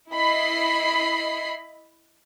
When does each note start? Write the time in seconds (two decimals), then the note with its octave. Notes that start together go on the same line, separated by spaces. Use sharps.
0.11 E4 D#5 B5 C7